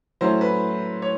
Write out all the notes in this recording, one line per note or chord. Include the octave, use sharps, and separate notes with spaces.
A2 F#3 A3 C#4 C5
B4
C#5